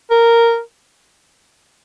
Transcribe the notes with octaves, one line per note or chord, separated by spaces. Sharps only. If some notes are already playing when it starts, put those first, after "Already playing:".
A#4